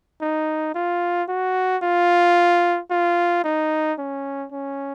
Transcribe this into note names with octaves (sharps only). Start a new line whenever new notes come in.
D#4
F4
F#4
F4
F4
D#4
C#4
C#4